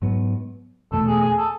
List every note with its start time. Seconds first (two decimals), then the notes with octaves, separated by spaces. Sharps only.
0.02 G#2 F#3 B3
0.92 E2 B2 A3 A4
1.07 G#4
1.21 G#4
1.37 A4